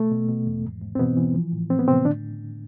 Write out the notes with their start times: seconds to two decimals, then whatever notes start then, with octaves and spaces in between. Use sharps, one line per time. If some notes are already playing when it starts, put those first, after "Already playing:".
Already playing: B2 A3
0.11 B2
0.28 B2
0.47 E2
0.65 G#2
0.82 G#2
0.95 C4
0.99 B2 E3 B3
1.17 E3
1.35 F3
1.52 A2
1.70 A2 C4
1.79 B3
1.88 A2 C3 C4
2.05 D3 D4